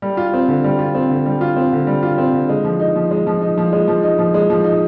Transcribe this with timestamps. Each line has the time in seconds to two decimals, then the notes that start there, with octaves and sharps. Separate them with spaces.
0.02 G3
0.17 F4
0.34 C4
0.48 D3
0.64 G3
0.79 F4
0.95 C4
1.10 D3
1.26 G3
1.41 F4
1.56 C4
1.72 D3
1.87 G3
2.03 F4
2.18 C4
2.33 D3
2.49 G#3
2.64 F3
2.80 D#4
2.96 F3
3.11 G#3
3.27 F3
3.42 D#4
3.57 F3
3.73 G#3
3.88 F3
4.03 D#4
4.19 F3
4.34 G#3
4.50 F3
4.64 D#4